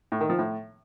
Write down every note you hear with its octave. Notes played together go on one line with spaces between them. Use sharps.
A2
D#3
F3
A2